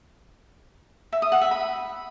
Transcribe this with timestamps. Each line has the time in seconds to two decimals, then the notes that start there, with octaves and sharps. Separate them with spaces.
1.13 E5
1.22 D#6
1.32 F#5
1.41 E5
1.51 B5